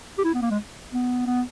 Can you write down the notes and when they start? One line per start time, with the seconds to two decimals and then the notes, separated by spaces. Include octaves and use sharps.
0.18 G4
0.24 E4
0.34 B3
0.42 A#3
0.51 G#3
0.92 B3
1.27 B3